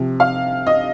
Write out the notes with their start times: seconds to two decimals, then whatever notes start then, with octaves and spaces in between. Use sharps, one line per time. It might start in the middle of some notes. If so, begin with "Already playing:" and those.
Already playing: C3 F3
0.20 F5
0.67 D#5